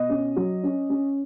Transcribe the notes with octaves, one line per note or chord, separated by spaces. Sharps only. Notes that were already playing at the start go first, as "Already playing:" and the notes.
Already playing: B2 D#5
C#4
F#3
C#4
C#4